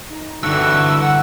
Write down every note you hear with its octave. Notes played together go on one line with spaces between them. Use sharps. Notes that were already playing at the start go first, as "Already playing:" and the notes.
D#4
G2 D3 E3 F#4 E6
F#5